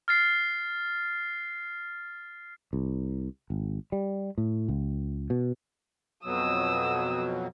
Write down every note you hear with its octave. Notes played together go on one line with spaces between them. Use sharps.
F6 A6 C7
C2
G#1
G3
A2
C#2
B2
F2 B2 F#3 D#6 E6